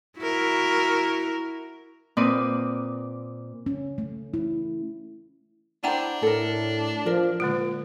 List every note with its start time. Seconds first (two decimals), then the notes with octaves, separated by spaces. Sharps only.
0.19 E4 F#4 A#4
2.17 A#2 C4 B4 D5 D#6
3.66 C#4
3.98 A3
4.34 E4
5.84 D4 E4 C5 F#5 G5 A#5
6.23 A2 A4 A#4
7.06 F3 A#4 D5
7.40 A#2 D3 G#3 F4